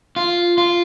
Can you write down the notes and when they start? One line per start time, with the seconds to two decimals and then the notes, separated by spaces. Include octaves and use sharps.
0.16 F4
0.58 F4